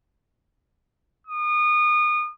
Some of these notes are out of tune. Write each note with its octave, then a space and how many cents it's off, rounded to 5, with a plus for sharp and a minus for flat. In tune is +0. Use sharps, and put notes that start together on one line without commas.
D#6 -30